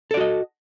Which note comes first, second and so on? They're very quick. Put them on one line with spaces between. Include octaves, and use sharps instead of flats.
A4 D5 F#4 D#5